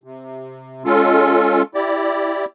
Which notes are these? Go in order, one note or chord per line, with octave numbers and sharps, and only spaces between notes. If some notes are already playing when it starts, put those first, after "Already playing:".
C3
G#3 C#4 F4 A4
E4 G4 D5